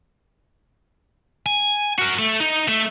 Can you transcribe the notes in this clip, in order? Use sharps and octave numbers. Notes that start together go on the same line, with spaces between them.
G#5
F#4 A#4
A3
D#4
A3